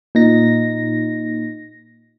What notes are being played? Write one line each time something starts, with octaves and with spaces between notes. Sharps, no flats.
A#2 D#4 A#6